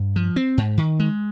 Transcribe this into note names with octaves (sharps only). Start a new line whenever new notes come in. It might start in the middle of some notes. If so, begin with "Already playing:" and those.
Already playing: G2
F3
C4
G#2
D#3
G#3